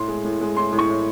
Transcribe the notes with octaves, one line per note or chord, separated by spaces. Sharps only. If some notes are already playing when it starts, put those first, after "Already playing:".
Already playing: A2 C6
G#3
A2
G#3
A2 C6
A2
C#6
A2